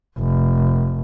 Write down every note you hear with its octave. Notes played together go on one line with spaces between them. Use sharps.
F1